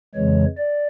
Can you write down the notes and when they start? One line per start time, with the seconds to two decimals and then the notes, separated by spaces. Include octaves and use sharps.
0.15 F2 C#3 E3 G#3 C#5
0.58 D5